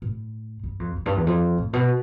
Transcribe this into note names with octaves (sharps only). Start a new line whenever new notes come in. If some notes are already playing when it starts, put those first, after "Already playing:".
A2
G2
F2
F2
G2
E2
F2
A2
B2